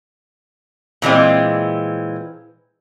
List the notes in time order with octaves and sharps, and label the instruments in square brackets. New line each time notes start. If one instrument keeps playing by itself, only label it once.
[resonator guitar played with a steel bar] A#2 E3 G#3 C4